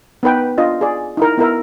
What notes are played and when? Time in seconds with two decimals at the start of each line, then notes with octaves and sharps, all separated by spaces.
0.23 B3 D#4 B4 G5
0.58 D4 F4 D#5
0.81 G#4 D5
1.17 D#4 E4 A#4
1.37 B3 E4 A#4 E5